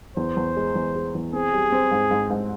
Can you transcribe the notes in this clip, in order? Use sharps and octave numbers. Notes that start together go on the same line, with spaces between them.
E2 C5
E2
G#3
E2
G#3
E2
C4 G#4
G3
C4
G#2
G#2
G#2